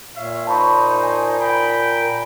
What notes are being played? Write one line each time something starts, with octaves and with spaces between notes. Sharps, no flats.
A#2 C#5 E5 F5
D#4 C5 A5 B5 C#6
G#5
G5 A#5 B5